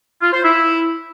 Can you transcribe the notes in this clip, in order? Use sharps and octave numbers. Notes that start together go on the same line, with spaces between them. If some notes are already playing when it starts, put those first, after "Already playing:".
F4
C5
E4